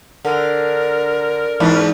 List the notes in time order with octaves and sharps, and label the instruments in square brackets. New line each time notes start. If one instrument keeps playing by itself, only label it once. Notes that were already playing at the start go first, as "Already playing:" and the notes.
[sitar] D3 [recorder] A#4
[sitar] E2 G#2 D4